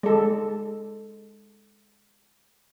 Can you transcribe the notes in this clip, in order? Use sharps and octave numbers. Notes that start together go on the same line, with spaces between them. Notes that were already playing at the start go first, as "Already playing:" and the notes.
G#3 A4